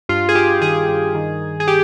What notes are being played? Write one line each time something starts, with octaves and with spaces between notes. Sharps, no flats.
G2 F4
G#4
G2 G4
D#3 G#4
G2
D#3
D#3
G#4
G4